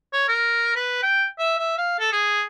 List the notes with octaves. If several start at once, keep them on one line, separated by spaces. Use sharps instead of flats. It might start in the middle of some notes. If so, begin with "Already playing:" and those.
C#5
A#4
B4
G5
E5
E5
F5
A4
G#4